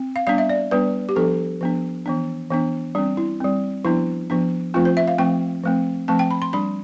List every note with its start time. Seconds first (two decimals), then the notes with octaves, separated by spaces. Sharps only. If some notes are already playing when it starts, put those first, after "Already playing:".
Already playing: C4
0.16 F5
0.27 G3 B3 D4 F5
0.38 E5
0.49 D5
0.71 G3 B3 D4 B4
1.09 G4
1.16 F3 B3 D4 A4
1.61 F3 B3 D4
2.06 E3 B3 D4
2.50 E3 B3 D4
2.95 G3 C4 D4
3.17 E4
3.40 G3 C4
3.85 F3 B3 D4 E4
4.30 F3 B3 D4
4.74 F3 A3 C4 F4
4.85 C5
4.97 E5
5.08 F5
5.18 F3 A3 C4 G5
5.63 F3 A3 C4
6.08 F3 A3 C4 A5
6.19 G5
6.31 B5
6.42 C6
6.53 G3 D4 B5